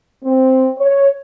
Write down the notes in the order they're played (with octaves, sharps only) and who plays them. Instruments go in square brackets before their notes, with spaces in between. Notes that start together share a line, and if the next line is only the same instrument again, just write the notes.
[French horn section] C4
C#5